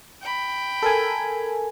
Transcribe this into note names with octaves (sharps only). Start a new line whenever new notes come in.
G5 B5
A4 A#4 G#5